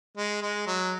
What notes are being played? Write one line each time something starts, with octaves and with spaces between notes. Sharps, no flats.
G#3
G#3
F#3